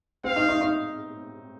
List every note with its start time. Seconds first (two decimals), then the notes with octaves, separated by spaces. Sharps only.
0.24 C4 F5
0.36 D#4
0.49 D#4
0.61 D#4